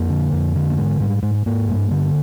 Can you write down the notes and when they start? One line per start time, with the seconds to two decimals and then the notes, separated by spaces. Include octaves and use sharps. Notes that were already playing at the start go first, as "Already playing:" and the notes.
Already playing: F2 A#3
0.10 D3
0.33 F2
0.56 D3
0.70 A#3
0.77 G#2 G#3
1.00 G#2 G3
1.23 G#2 G#3
1.35 G#3
1.46 G#2 A#3
1.68 G2
1.91 D3